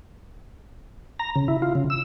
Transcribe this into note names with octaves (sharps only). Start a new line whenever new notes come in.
A#5
C#3
E4
F4
C#3
E6